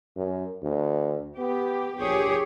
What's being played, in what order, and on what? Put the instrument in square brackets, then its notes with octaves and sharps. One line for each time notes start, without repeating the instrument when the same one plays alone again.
[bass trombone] F#2
D2
[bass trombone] B3 [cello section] G4
[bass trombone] A#1 [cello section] G4 G#4 C#5